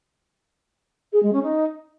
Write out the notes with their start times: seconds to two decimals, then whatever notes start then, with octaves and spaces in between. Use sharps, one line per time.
1.12 G#4
1.22 G#3
1.32 C#4
1.42 D#4